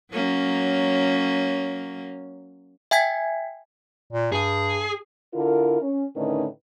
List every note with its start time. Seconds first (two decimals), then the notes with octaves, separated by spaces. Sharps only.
0.12 F#3 A#3 C#4
2.91 E5 G5 G#5 G#6 B6
4.13 A#2
4.32 G2 G#4
5.34 D3 E4 F4 A#4
5.82 C#4
6.16 A2 D3 D#3 C#4 D#4 B4